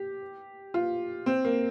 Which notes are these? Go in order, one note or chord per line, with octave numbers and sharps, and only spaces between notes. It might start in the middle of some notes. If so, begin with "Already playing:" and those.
Already playing: G4
F4
C4
A#3